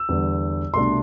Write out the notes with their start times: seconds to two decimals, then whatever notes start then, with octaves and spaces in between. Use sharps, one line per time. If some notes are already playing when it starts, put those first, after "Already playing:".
Already playing: E6
0.09 E2 D3 G3 B3
0.74 C2 B2 A3 D4 C6